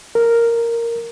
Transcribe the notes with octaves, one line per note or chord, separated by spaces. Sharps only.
A#4